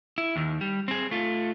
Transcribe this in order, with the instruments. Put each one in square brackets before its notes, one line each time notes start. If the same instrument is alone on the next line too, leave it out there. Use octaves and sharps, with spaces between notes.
[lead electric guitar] E4
D#2 D#3
G3
C4 G#4
A3 F4